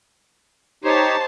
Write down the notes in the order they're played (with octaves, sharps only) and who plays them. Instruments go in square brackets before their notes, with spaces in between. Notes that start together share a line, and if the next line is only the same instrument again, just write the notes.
[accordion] D#4 G4 C#5 [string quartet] C5 A5